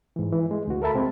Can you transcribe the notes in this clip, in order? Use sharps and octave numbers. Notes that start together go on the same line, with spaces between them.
G#2 E3
E3
G#3
D2 F#4
A4 A#4 E5 A5 B5
A#2 C#3 G#3 C4